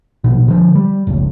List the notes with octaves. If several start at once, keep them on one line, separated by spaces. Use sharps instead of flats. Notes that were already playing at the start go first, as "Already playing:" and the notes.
A#1 B2
D3 F3
G3
F1 C#2